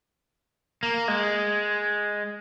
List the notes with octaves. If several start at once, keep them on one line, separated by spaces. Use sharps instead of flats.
A#3
G#3